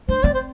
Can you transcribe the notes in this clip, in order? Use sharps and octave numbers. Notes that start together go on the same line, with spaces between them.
D4 C5
C4 D5
C5